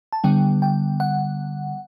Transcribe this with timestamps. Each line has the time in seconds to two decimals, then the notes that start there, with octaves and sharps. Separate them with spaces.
0.13 A5
0.24 D3 G3 B3 G5
0.62 G5
1.00 F#5